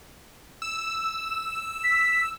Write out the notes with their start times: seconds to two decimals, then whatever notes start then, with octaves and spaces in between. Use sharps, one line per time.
0.62 E6
1.84 B6